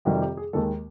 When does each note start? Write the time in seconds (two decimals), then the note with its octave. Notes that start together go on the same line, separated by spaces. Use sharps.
0.05 F2 C3 D#3 G3 F#4
0.22 G4
0.37 G#4
0.53 D#2 D#3 G#3 A4